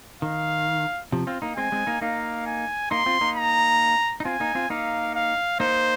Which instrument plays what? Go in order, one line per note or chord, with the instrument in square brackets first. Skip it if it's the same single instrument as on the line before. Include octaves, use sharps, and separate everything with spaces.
[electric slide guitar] D#3 [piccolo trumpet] F5
[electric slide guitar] C3 F3
C4 F4
A#3 D#4
[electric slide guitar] G#3 C4 [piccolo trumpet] G#5
[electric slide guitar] G#3 C4
A#3 D#4
[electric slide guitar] A#3 D#4 [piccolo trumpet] F5
[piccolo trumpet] G#5
[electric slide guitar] A#3 D#4 [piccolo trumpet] C6
[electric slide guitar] C4 F4
A#3 D#4
[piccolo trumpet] A#5
[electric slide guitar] D#4
[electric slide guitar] C4 F4 [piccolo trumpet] G#5
[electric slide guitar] A#3 D#4
C4 F4
[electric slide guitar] A#3 D#4 [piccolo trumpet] F5
[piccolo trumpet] F5
[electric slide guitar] A#3 D#4 [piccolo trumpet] C5